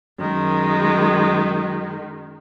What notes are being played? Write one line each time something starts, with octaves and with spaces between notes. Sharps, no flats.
F#2 D#3 G#3